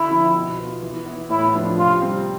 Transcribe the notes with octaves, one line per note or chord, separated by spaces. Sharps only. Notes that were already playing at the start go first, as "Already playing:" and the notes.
Already playing: D3 E4
F3 C4
B2
B3 F4
E3
B3 E4
A2 E4
F3 B3 D4 F4
C3 F4
G3 C4